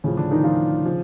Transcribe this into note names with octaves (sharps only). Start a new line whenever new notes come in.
A2 C#3 F3 C#4
D3 D4
D#3 D#4
F3 F4
C#3 F3